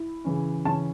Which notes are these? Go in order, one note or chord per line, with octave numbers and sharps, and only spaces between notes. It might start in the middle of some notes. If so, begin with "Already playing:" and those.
Already playing: E4
C#3 E3 C#4
C#3 E3 C#4 A5